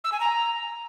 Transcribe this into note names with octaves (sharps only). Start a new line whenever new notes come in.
E6
G#5
A#5